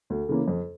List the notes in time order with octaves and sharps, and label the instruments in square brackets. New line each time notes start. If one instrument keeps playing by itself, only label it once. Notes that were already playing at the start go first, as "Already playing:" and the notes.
[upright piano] D2
C#3 E3 A#3 C#4
F2